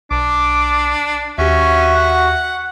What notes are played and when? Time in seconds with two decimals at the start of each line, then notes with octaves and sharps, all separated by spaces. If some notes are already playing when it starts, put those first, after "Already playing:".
0.11 B1 D4 D6
1.38 D#2 C#4 F#4 G4 E5
1.94 F#5